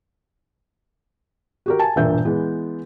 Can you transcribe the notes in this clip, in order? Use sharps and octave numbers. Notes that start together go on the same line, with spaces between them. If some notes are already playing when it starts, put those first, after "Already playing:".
F#4 G4 A#4
G#5 A5
E1 G2 A#2 E5 G6
E3 G#3 B3